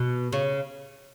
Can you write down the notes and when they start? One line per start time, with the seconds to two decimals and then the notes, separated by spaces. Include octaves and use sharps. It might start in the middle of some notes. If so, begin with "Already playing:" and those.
Already playing: B2
0.33 C#3